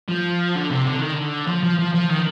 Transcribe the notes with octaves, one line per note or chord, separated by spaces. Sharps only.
F3
D3
C3
D3
D#3
D3
F3
F3
F3
F3
D#3